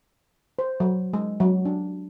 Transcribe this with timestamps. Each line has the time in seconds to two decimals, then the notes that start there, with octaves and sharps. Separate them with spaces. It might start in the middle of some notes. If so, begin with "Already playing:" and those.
0.59 C5
0.80 F#3
1.13 G#3
1.40 F#3
1.65 D4